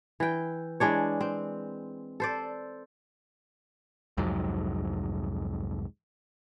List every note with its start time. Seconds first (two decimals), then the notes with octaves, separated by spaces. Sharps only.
0.20 E3 G5
0.80 E3 G#3 D4 C#5
1.21 C4
2.20 A4 C5 D5
4.17 C2 F2 G#2 F#3